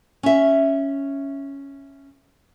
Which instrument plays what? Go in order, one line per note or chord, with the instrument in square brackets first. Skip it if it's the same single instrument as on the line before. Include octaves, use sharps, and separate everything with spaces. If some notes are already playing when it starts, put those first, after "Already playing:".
[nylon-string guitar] C#4 E5